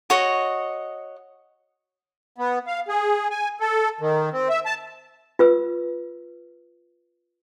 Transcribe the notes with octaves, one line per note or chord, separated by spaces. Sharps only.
F#4 C#5 D#5
B3
F5
G#4
G#5
A4
D#3
C4
E5
A5
F4 B4 E6